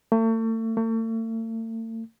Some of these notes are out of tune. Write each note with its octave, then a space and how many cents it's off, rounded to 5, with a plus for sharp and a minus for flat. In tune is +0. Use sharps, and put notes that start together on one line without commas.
A3 +40
A3 +45